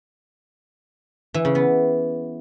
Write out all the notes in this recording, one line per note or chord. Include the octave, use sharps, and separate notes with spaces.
E3
C#3
B3